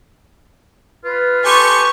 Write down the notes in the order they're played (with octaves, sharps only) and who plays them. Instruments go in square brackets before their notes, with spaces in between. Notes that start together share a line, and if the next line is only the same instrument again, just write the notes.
[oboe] F4 [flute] B4
[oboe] G4 [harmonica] A4 G#5 C6 [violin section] C#6